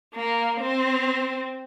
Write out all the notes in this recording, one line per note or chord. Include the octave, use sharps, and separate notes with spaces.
A#3
C4